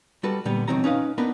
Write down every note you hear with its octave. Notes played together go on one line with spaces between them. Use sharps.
G3 F#4 A4 B4
A#2 D3 G3 B3
B1 D#3 E3 C4 F#4 A#5
C#4 D#4 B4 F5
B3 D4 D#4 A#4 B4